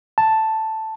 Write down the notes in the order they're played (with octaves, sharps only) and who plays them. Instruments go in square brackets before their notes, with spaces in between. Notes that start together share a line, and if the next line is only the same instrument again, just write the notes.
[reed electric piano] A5